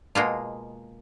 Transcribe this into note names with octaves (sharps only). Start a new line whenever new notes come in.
B2 G#3 A#3 F4